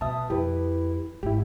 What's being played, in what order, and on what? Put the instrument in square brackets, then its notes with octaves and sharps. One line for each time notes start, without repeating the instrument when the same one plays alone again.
[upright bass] B2 [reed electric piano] E5 A5 [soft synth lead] D#6
[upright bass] F2 [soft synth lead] E4 [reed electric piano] G4 B4
[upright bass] G#1 [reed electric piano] E4 G4